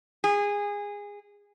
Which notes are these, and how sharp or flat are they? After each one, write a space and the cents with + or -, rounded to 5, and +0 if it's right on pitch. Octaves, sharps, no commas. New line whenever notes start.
G#4 -20